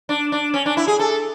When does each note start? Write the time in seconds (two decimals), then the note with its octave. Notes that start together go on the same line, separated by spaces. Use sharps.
0.09 D4
0.32 D4
0.54 C#4
0.66 D4
0.77 E4
0.88 G#4
0.99 A4